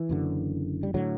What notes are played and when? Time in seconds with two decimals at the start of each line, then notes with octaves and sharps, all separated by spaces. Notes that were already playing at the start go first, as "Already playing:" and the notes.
Already playing: E3
0.09 F#1 F#2 D3
0.83 G3
0.94 A2 D3 F#3